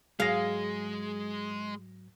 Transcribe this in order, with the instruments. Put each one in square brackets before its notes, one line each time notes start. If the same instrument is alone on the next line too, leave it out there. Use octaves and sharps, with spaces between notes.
[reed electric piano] G#2 F#3 [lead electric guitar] G#3 [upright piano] G#4 A#6 [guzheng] F5